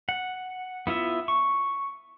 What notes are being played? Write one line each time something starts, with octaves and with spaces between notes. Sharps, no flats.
F#5
B3 E4 F4 E5
C#6